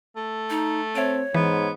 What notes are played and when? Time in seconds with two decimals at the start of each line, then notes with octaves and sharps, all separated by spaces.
0.16 A3
0.50 D#4
0.95 C4 C#5 E5 D7
1.34 G#2 E3 B3